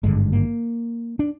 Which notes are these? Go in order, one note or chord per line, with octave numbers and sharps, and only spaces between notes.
G#1 G2 D3 G#3
A#3
D4